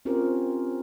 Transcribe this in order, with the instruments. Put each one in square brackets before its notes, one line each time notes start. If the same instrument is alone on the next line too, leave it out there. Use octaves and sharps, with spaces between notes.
[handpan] C4 C#4 F4 G4 A#4 C5